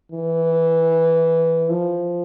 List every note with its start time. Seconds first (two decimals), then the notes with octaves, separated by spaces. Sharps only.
0.12 E3
1.70 F3